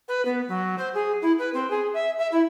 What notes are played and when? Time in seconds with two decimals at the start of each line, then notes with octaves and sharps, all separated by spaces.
0.08 B4
0.25 B3
0.48 F#3
0.78 C5
0.94 G#4
1.22 E4
1.38 B4
1.53 C4
1.70 G#4
1.93 E5
2.18 E5
2.31 E4